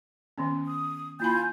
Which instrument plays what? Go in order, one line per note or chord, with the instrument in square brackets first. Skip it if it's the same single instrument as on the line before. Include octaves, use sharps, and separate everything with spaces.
[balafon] D#3 B3 C#4
[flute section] D#6
[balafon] A#3 E4 B5 [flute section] F4 G#5 G6